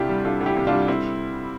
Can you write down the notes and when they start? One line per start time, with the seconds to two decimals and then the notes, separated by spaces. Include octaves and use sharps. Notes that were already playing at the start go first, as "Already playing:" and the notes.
Already playing: D2 C3 D4 E4 F4 G4
0.09 G3
0.25 D4 F4 A4
0.41 D2
0.46 E4 G4
0.57 C3
0.67 D4 F4
0.72 G3
0.88 C4 E4